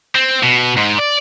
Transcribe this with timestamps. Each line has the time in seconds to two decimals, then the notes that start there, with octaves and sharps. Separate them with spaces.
0.15 C4
0.43 B2
0.77 G#2
0.99 D5